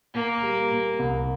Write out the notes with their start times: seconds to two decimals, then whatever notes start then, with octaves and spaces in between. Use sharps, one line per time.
0.14 A#2 A#3
0.42 G3
0.71 A#2
0.99 C2